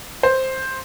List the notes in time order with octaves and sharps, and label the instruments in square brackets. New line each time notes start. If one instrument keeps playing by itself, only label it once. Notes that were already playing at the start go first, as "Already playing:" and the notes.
[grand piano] C5